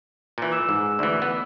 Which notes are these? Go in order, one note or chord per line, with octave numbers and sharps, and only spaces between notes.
A#2 E3
D6 E6 E7
G#2
D2 E3
B3